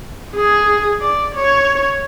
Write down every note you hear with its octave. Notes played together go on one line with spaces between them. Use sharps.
G#4
D5
C#5